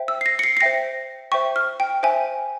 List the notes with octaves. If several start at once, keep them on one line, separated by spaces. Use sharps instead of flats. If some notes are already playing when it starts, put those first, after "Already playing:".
Already playing: C5 E5 G5
E6
C7
A#6
C#7
C7
C7
C5 E5 G5 A#6
C5 E5 G5 C#6
F6
G5
C5 E5 G5 G#5